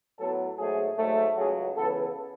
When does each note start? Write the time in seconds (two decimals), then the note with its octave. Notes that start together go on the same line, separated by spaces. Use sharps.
0.18 A2 F#3 B3 A4
0.57 G#2 F#3 A3 G#4
0.96 G#2 F#3 A3
1.36 C#2 C#3 F#3 G#4
1.75 C#2 C#3 E3 B3 A4